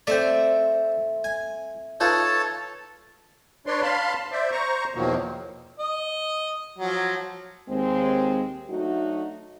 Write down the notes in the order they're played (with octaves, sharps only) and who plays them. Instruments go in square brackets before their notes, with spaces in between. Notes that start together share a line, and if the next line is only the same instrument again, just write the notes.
[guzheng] A3 C4 [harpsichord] D5 G5
[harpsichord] G#5
[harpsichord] D#4 F4 B4 [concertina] A4 C#5 A5
[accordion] D4 B4 C#5 D5 C6
F5 A5 B5 C6
C5 D5 E5
C5 A#5 C#6
E2 B2 D#3 F3 F#3 A#3
[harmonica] D#5
F3 F#3
[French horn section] D#2 G#3 C4
F#3 A3 D4 D#4 F#4